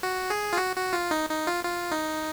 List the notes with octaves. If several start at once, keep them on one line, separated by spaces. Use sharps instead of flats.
F#4
G#4
F4
F#4
F#4
F4
D#4
D#4
F4
F4
D#4